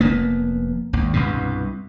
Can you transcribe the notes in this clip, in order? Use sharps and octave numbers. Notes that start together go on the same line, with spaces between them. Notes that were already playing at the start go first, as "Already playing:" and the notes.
F1 A#3 B3
G#1 D#2
C2 G2 B2